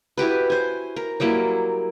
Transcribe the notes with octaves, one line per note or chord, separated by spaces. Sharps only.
E4 F#4 G4 B4
C5 G#5
A#4
F#3 G3 A#3 E4